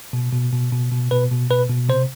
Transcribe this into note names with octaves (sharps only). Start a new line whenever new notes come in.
B2
B2
B2
B2
B2
B2 B4
B2
B2 B4
B2
C3 C5